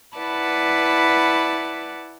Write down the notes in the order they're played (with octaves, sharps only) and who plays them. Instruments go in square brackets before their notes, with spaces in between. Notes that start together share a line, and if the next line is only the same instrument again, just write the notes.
[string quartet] E4 B4 D5 F#5 A5 B5